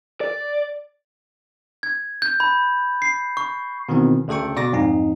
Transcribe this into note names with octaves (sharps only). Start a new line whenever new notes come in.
D5
G#6
G6
B5
C7
C#6
B2 D#3 E3 B3 C4
D2 C#3 A4 G5 C#6
B2 D5 D6 A#6
F2 G#2 D#4